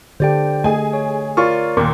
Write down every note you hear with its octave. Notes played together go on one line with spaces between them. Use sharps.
D3 G4 A4 C5 D5 G5
A3 G#4 D#5 G#5
C#5
F4 A#4 C#5 D5 C#6
D#2 A#2 A#4 C6 D6